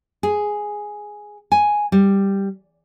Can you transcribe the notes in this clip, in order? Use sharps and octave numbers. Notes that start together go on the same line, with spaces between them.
G#4
G#5
G3